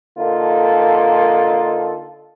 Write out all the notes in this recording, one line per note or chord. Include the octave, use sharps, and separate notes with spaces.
D3 A#3 D#4 F4 A4